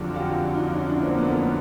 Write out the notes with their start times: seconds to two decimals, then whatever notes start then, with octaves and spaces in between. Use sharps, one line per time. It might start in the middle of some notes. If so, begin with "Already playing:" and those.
Already playing: F2 D3 F#3 G4 A4
0.10 F#4
0.15 F4 G4
0.54 D#4 F4
0.73 C#4 D#4
0.88 D4 E4
1.02 A#3 C4
1.17 A3 B3
1.31 A3 B3